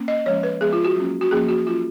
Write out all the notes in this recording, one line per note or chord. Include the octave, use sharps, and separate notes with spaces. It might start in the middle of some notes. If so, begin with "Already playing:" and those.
Already playing: A#3 C#4
D#5
F3 G#3 C#4 C#5
B4
F3 G#3 B3 G#4
F4
F#4
F#3 A#3 C#4
F#4
F3 A#3 C#4 G#4
F#4
F#3 C#4 F4